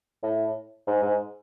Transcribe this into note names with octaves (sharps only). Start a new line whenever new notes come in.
A2
G#2
G#2